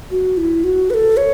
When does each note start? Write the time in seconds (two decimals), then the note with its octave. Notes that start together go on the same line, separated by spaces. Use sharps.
0.11 F#4
0.37 E4
0.64 F#4
0.90 B4
0.94 A4
1.17 C#5